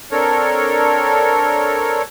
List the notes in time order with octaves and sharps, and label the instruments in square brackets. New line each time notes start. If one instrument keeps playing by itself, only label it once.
[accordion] C4 D4 A4 A#4 C#5